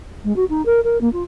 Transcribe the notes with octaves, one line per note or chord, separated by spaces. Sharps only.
G#3
F#4
D#4
A#4
A#4
A#3
F4